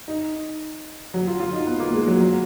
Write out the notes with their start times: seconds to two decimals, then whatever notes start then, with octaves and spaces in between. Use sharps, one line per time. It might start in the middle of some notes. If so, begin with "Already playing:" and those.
0.08 D#4
1.14 F#3
1.27 F4
1.40 F4
1.53 D#4
1.67 B3
1.80 A#3
1.93 G#3
2.07 F#3
2.21 F#3